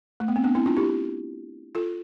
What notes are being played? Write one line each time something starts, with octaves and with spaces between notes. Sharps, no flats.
A3
B3
C4
B3 D4
C4 E4
D4 F4
E4 G4
F4 A4